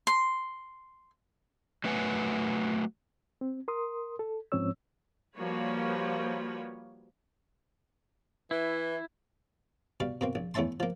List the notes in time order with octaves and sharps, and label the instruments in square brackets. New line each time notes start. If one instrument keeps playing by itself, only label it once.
[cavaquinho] C6
[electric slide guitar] F#3 A3 B4 F#5 G#5
[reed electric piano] C4
A#4 C6 D#6
A4
G#2 F3 C4 C#4 C#5 E6
[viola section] F3 G3 A#3 F#4 B4 C#5
[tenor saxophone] E3 [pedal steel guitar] E4
[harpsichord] B2 G3 F5
B2 A#3 C4
A#1
E2 A3 C#4 E5 A5 C6
F3 A#3